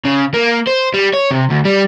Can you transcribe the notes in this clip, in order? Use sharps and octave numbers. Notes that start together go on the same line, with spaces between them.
C#3
A#3
C5
G3
C#5
C3
D2
G3